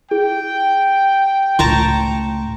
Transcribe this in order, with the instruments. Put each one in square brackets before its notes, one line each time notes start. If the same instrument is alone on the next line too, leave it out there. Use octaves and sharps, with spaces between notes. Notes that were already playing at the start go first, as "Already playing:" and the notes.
[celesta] E4 G#4 [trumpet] G5
[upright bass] C#2 A2 [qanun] A5 A#5 C#6 [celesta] C6